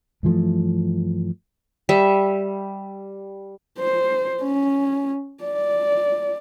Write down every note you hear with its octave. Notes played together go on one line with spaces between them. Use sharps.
G2 E3 F3 A3
G3 E5
C5
C#4
D5